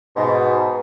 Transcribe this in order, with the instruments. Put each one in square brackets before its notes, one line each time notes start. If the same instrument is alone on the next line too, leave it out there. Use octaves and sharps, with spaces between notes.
[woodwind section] G#2 B2